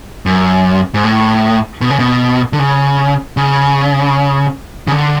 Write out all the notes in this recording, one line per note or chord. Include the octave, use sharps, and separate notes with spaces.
F#2
G#2
A2
B2
C#3
B2
D3
C#3
C#3
C#3
D3